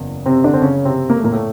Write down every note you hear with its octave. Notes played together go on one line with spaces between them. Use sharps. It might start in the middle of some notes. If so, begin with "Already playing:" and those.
Already playing: F#1 E2
C3 C4
D3 D4
C4
C#3 C#4
C3 C4
A#3
A3
A#2 A#3
A2 A3